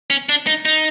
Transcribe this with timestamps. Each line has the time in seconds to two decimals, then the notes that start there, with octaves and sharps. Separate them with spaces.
0.10 C#4
0.29 D4
0.47 D#4
0.65 D#4